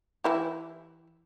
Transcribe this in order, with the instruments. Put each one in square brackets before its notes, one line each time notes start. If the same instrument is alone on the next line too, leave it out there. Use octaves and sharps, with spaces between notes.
[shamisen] E3 E4 G4